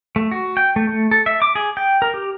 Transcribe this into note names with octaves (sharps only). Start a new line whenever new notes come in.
A3
F#4
G5
A3
A3
A4
E5
D6
G#4
G5
A#4
G4